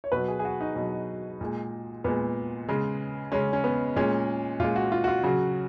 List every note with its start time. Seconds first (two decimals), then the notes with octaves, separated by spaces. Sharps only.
0.04 C#5
0.12 B2 F#3 B4
0.28 G#4
0.39 G#4
0.45 F#4
0.60 D#4
0.76 B2 F#3
1.41 A#2 G#3
2.04 A#2 G#3 B3
2.69 C#3 G#3
3.32 C#3 G#3 C#4
3.53 C#4
3.64 B3
3.96 A#2 G#3 C#4
4.60 A#2 G#3 F4
4.76 F#4
4.92 F4
5.04 F#4
5.08 F4
5.24 C#3 F#3 F#4